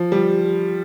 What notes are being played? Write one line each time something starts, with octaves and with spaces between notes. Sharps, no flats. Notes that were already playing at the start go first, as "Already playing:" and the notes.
Already playing: F3
G3